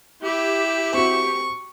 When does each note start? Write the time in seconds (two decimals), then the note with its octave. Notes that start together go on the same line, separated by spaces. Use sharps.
0.23 E4 G4
0.94 C4 F#4 C#6